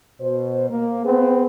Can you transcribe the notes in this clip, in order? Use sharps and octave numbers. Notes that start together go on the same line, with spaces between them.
B2 C5
A#3
B3 C4 G#4 B4